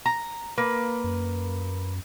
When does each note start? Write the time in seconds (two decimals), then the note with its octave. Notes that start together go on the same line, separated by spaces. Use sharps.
0.06 A#5
0.58 A#3 B4
1.04 F#2